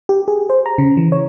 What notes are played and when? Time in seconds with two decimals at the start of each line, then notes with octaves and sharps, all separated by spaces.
0.09 G4
0.28 G#4
0.50 C5
0.66 A#5
0.78 C#3
0.97 E3
1.12 C#5